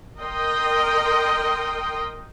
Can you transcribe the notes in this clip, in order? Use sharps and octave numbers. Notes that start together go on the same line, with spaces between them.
A#4 D#5 G5 C6